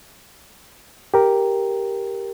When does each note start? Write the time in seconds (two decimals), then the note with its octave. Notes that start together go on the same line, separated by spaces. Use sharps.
1.14 G4 A#4